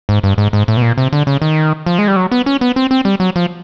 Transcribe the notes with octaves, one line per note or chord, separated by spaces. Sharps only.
G#2
G2
G#2
G#2
A2
B2
A#2
C3
D3
C#3
D#3
F3
G#3
G3
F#3
B3
C#4
B3
C4
C4
G3
F#3
F3